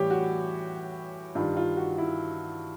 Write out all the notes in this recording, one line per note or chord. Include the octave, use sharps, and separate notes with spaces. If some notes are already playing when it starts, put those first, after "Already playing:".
Already playing: A2 E3 G3 G4 C#5
F#4
G2 D#3 G3 F4
F4
F#4
E4